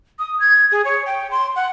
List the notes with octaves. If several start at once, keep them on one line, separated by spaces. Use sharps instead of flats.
D#6
G#6
G#4
C#5
G5
C6
F#5